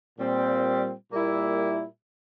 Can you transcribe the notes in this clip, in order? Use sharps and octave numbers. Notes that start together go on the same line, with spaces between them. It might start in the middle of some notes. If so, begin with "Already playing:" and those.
A#2 G3 C4
A#2 G3 A#3 E4